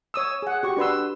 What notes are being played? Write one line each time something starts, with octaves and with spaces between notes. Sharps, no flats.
C#5 D#6 E6
G#4 F#5
F#4 G4 C#6
D4 B4 C6 E6